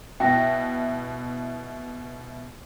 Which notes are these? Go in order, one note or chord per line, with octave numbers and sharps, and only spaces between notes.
B2 E4 E5 G5 A#6